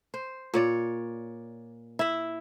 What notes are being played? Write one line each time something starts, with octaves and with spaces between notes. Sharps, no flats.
C5
A#2 C#5 D5
E4 E5